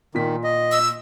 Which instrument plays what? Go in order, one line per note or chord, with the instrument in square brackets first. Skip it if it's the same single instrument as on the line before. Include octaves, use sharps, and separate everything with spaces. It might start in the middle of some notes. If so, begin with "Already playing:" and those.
[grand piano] A#2 B6 [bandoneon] D#3
[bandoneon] D#5
[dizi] E6